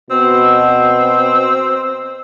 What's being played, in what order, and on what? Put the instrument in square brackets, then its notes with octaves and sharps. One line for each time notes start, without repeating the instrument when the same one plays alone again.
[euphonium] B2 [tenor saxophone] C4